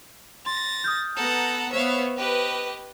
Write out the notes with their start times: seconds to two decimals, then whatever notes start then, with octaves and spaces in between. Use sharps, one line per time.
0.46 C6 A6 A#6
0.84 D#6 F6 G6
1.16 B3 A4 F#5 A#5
1.73 B3 C5 C#5 E5 F5
2.17 G4 B4 D#5